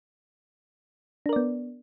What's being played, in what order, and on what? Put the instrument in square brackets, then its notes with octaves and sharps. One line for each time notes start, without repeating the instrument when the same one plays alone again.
[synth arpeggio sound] D4
A#4
D5
B3